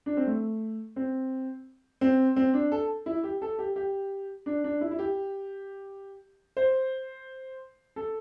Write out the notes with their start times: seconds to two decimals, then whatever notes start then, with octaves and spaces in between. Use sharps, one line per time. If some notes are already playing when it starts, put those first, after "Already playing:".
0.06 D4
0.17 C4
0.26 A3
0.96 C4
2.01 C4
2.36 C4
2.54 D4
2.72 A4
3.06 E4
3.24 G4
3.42 A4
3.59 G4
3.76 G4
4.46 D4
4.64 D4
4.81 E4
4.91 E4
4.99 G4
6.57 C5
7.96 A4